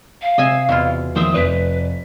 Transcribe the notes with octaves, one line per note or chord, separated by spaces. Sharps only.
F5
C3 C4 D#5 E5 G#5
E2 B2 E4 F4
D#3 F3 A#3 C5 E5 D#6
F1 B4 D5 B6